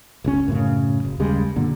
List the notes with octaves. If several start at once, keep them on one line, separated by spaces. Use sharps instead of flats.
F1 C#2 C#4
F#2 A2 C#3
F#1
D#2 C#3 G3 G#3
F#2 A#2 D3 A#3